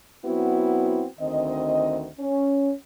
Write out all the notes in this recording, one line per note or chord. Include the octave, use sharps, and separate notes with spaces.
F#3 B3 C4 E4 F#4
D2 D#3 C4 D#5
C#4